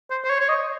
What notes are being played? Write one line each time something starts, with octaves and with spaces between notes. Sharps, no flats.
C5
C5
C#5
C#5
D#5